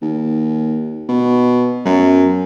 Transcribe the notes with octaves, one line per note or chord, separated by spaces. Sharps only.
D#2
B2
F#2